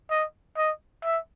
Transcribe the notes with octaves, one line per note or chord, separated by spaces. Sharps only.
D#5
D#5
E5